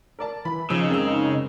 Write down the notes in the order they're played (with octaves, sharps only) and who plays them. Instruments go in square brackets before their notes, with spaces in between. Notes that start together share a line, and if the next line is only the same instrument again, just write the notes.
[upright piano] A#4 D5 A5
[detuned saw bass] E3 [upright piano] B5
[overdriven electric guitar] C#3 [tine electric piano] F3 [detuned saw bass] D#4 [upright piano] E6
[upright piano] F#1 G#3 E6 [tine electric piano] C4